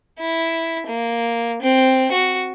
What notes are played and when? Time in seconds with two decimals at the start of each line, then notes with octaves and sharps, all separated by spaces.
0.20 E4
0.87 A#3
1.62 C4
2.12 F#4